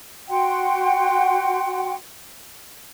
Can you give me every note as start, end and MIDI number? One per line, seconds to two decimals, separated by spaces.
0.29 1.95 66
0.29 1.95 78
0.29 1.95 79
0.29 1.95 84